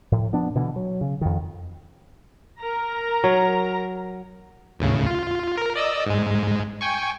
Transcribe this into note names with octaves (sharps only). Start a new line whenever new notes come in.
A2 F3
F3 B3 D4
B2 D3 E3
F#3
C#3
F2 D#3
A#4 A#5
F#3
D#2 A2 C#3
F4
A#4
D5 D#5 E6
G#2 G#3
G5 G#5 C#6